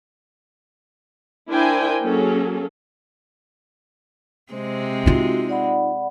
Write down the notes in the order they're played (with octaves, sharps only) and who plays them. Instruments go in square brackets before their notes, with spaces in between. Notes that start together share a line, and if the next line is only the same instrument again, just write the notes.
[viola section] D4 E4 A#4 C5 G5 G#5
F#3 A#3 C#4 G#4 A4
[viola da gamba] C3 G#3 C4 [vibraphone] C5
[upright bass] D#4 F4 [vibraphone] F#4
[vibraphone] D5 F#5 B5